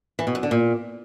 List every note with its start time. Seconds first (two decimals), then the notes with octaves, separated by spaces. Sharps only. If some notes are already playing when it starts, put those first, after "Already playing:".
0.19 E3
0.27 B2
0.35 F#2
0.43 D3
0.51 A#2